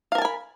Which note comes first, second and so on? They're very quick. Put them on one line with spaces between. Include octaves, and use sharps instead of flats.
F5 A#4 A5 G#5 B5